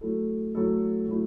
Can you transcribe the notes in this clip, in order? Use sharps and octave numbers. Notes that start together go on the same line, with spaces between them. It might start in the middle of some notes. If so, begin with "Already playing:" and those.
F#3 A3 E4 A4
F#3 A3 E4 A4
F#3 A3 E4